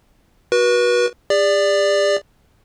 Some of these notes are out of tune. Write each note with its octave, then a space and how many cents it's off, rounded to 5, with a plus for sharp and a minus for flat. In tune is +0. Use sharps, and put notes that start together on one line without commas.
F#4 +0 B4 -35
G#4 -45 D5 +0